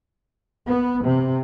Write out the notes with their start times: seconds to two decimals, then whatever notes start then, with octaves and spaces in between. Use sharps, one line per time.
0.66 B3
1.03 C3